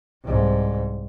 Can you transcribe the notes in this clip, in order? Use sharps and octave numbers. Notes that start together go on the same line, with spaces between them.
C2 G#2